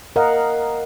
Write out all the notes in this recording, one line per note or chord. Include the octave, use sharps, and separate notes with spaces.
A#4 D#5 F5 F#5